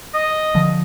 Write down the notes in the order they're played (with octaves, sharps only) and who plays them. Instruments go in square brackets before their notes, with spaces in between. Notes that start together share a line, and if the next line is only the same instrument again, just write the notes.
[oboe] D#5
[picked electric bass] D3 F3